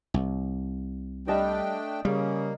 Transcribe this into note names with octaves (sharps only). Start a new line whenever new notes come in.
C2
G3 A3 D4 D5 D#5 G5 A5
C#3 G3 A#3